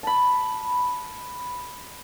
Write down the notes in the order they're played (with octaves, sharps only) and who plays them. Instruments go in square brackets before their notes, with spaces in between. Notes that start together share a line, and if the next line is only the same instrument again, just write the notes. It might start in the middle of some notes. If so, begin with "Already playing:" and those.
[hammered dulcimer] A5 B5